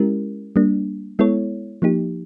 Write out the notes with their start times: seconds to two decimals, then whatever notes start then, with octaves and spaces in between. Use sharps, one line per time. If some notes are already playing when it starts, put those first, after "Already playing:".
Already playing: G#3 C#4 E4 G4 A#4
0.56 G3 A#3 D4
1.19 G#3 B3 E4 A4 C#5
1.82 F3 A#3 D#4 G4